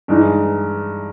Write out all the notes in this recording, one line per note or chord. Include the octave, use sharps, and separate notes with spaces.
G2 E3 G#3 D#4